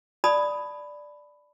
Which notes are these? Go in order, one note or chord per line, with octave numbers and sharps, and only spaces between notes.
D5 A5 B5 D#6